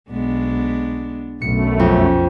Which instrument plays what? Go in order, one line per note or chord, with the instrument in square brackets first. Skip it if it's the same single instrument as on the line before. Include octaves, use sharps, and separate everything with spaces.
[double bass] B1 [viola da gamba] G#3 B3 D4
[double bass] B1 [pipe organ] F#2 A3 [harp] C#7
[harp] F2 [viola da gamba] C#4